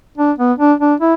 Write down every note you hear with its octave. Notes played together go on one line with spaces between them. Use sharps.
D4
B3
D4
D4
E4